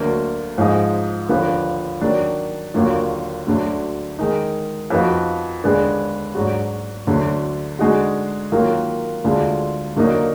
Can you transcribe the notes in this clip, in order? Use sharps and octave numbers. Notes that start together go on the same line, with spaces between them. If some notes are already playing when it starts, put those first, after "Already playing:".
Already playing: D2 D3 F#3 A#3
G#2 F3 G#3 D#4
D#2 D3 F3 B3
D#3 F#3 D4
D#2 D3 F#3 A#3 F4
D2 D3 F#3
D#3 G#3 D#4
F2 F3 B3 D#4 F#4
D#2 D3 G#3 B3 D4
G#2 F#3 D4 F#4
D2 D3 F#3
D3 G#3 D#4 F#4
D#3 F#3 A#3 F4
D2 D3 G#3 D4 F4
D#2 D3 F#3 A#3 D#4